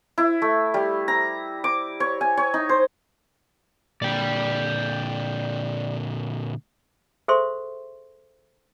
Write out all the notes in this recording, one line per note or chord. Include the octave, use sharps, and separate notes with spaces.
E4
A3
G3
A#5
D6
C#5
G#5
C#5
D#4
C5
A#2 D3 D5 G5
G#4 A4 C5 E5 C6 C#6